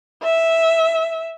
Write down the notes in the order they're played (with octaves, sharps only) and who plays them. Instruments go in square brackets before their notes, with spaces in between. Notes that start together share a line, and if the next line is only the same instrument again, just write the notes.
[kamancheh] E5